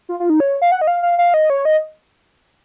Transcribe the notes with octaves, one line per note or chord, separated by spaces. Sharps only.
F4
F4
D#4
C#5
F5
F#5
D#5
F5
F5
F5
D#5
C#5
D#5